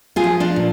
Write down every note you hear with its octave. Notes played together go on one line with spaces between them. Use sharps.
F4 G#4
F3
D4 F4
A#2